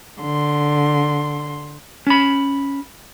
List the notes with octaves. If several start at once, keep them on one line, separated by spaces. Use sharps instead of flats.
D3 C6
C#4 B5